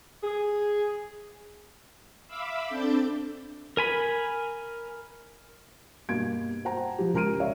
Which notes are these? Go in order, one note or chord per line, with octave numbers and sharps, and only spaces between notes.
G#4
E5 F5 B5 D6 E6
C4 D4 A4 D5 D6 G6
A#4 G#5 B5
G2 B2 A#3 G#6 D7
C5 F#5 G5 A5 A#5
F3 G4
C#2 A#4 A#5 F6 D7 D#7
C#5 D5 E5 F5